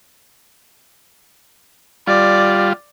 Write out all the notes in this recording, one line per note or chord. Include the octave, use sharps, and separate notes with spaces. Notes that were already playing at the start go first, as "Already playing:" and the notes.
G3 F4 D5